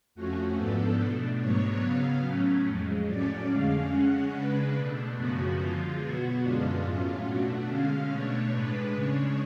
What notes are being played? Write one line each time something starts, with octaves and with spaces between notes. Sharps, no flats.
F2 F3 A3 C#4 F#4
G#2 F3 B3 D4 A4
B2 A3 D4
G#2 F#3 B3 D4 C#5
C#3 F#3 B3 F5
A2 F#3 A3 C#4
F2 F3 G#3
A2 F#3 A3 C#4 D5
F2 D3 G#3 C#4 F5
C#3 G#3 C#4 F#5
C#3 G#3 D4 B4
B2 A3 D4
F#2 C#3 F3 B3 F#4
D3 F3 G#3 F4
B2 F#3 B3 F#4
F#2 D3 G#3 B3 D4 F4
A2 F#3 A3 C#4 F4
B2 A3 D4 F#4
D3 G#3 C#4 F5
B2 A3 D4 C#5
A2 G#3 D4 B4
C#3 G#3 D4 C#5